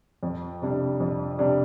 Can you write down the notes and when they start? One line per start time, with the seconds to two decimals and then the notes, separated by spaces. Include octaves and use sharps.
0.23 F2
0.62 C3 G3 D4
1.00 F2
1.39 C3 G3 D4